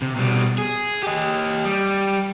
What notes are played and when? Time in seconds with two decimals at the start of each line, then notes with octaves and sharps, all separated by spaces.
0.02 C3
0.16 B2 G3
0.58 G#4
1.03 G4 D#5
1.65 G3